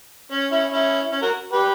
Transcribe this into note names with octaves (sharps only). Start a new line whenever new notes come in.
C#4
C#4 E4
C#4 E4
C#4
F#4 A#4
G4 B4